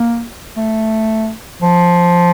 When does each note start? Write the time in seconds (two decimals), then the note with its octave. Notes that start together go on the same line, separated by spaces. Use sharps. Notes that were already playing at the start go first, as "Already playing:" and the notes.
Already playing: A#3
0.57 A3
1.62 F3